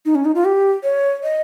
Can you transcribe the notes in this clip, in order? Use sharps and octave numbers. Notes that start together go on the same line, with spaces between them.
D#4
C#4
D#4
F4
G4
C#5
D#5